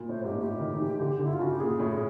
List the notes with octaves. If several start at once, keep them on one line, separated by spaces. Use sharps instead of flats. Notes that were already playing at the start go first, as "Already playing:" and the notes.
Already playing: A#2
A2 C5
G#2 G4
A#2
A2 G4
D#3
D#3
E3
D3
D3
E4
F4
C#3 F#4
G4
A#2 G#4
A2
G#4